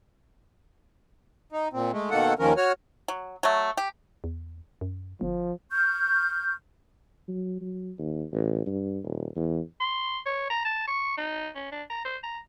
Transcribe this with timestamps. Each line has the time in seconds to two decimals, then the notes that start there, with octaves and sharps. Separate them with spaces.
1.52 D#4
1.73 A#2 C4
1.92 G#3 A3
2.10 B2 D#3 A#3 A4 F#5
2.39 D#2 D#3 F3 C#4 A#4
2.57 F#4 C#5 F6
3.08 F#3
3.43 F#3 A3
3.77 G4
4.24 E2
4.81 F#2
5.21 G1 F3
5.71 C#6 F6 G6
7.28 F#3
7.61 F#3
7.98 D#2
8.32 A1
8.66 G2
9.04 D#1
9.36 E2
9.80 C6
10.26 C#5
10.50 A#5
10.65 A5
10.87 C#6
11.18 D#4
11.55 C#4
11.72 D4
11.90 A#5
12.05 C5
12.23 A#5